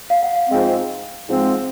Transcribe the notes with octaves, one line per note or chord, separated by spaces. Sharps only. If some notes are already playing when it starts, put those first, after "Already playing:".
F5
F#5
F5
G#2 F3 G#3 C4
G#2 F3 G#3 C4